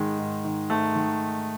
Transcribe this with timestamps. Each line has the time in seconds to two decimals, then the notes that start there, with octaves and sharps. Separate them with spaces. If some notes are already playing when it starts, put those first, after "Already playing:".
Already playing: G#2 D#3 G#3
0.19 G#2
0.45 D#3
0.70 G#2 A3
0.95 D#3